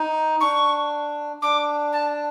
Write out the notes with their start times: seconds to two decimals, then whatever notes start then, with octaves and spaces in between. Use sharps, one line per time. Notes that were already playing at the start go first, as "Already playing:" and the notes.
Already playing: D#4
0.41 D4 C#6
1.42 D4 D6
1.93 A5